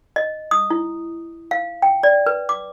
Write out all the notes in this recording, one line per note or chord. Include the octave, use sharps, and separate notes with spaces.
D#5
D#6
E4
F5
G5
D5
B4
D6